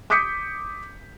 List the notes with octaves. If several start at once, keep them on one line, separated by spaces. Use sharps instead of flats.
D6 D#6 G6 B6 C#7